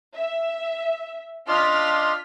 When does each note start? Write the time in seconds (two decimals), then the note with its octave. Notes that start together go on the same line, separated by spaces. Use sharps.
0.15 E5
1.48 D4 F4 D#5 C6 D6 F6 B6